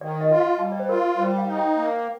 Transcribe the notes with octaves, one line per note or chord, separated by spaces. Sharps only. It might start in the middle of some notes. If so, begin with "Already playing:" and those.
D#3 D5
D#5
F4
F5
G3 A5
D5
C5
F4 A#4
G3 C5
F5
D#4
G5
A#3